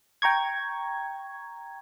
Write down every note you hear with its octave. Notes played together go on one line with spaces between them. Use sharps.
G5 A#5 C#6 G#6